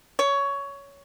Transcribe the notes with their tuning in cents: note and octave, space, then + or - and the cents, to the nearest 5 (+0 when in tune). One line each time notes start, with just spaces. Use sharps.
C#5 +15